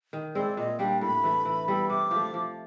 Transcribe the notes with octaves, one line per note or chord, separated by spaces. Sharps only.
D#3
G#3 C4 E4 D5
A#2 D#5
G3 A#3 D4 G5
A2 B5
E3 A3
E3
G3 B3 E4
C3 D6
F3 A3
F3